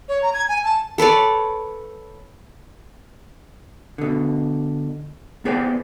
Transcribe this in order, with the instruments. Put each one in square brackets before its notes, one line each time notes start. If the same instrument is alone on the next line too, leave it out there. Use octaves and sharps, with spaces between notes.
[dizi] C#5
A#5
G#6
G#5
A5
[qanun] A4 B4 C#5 D5
[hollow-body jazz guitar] B2 D3
B3 G#4 B4 C5 D5 G5